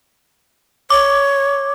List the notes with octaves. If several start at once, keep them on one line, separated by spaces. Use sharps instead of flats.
C#5 D6